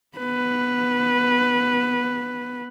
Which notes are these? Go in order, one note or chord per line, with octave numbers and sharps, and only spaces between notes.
B3 B4